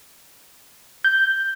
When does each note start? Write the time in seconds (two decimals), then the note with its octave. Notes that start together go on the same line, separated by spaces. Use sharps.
1.04 G6